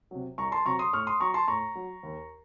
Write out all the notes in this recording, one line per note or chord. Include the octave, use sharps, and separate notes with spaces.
C3 F#3
C2 A#5 C#6
A5 C6
C3 F#3 A#5 C#6
C6 D#6
A2 C#6 F6
C6 D#6
F#3 A#5 C#6
A5 C6
A2 A#5 C#6
F#3
D#2